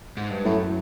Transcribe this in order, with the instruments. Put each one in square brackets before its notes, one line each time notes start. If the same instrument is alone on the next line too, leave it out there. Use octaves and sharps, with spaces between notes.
[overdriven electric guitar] G#2
G2
[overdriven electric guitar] F#2 [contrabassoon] A2